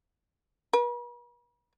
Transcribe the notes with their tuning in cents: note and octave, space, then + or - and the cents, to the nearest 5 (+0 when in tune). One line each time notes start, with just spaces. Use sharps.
B4 -45